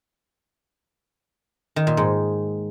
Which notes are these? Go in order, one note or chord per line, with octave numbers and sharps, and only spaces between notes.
D#3
A#2
G#2